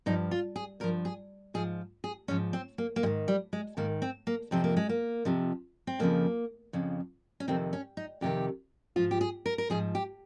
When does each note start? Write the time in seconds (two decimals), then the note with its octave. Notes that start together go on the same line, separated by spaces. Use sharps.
0.06 G2 F3 D#4
0.31 F4
0.56 G#4
0.80 G2 A#4
0.84 F3
1.05 G#4
1.54 G#2 F3 G#4
2.04 G#4
2.28 G#2 F3 C#4
2.53 C4
2.78 A#3
2.96 A#3
3.03 G#2 G#3
3.06 D#3
3.28 G3
3.53 G#3
3.77 G#2 D#3 A#3
4.02 C4
4.27 A#3
4.51 F2 C3 F3 C4
4.64 A#3
4.77 G#3
4.89 A#3
5.25 F2 C3 F3
5.87 C4
5.99 F2 C#3 F3 A#3
6.73 F2 C#3 F3
7.40 C#4
7.48 F2 C3 D#3 C4
7.73 C#4
7.97 D#4
8.21 F2 C3 D#3 G4
8.96 G#2 F3 F4
9.11 G4
9.21 G#4
9.46 A#4
9.58 A#4
9.70 G#2 F3 G#4
9.95 G4